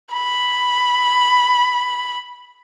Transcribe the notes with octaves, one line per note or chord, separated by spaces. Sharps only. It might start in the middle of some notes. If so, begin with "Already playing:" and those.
B5